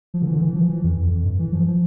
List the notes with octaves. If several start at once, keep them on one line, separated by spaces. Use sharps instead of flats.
F3
D3
E3
D3
E3
F3
E3
F2
F2
F2
G2
E3
F3
F3